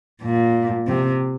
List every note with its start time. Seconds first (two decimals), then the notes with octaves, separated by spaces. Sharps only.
0.23 A#2
0.87 C3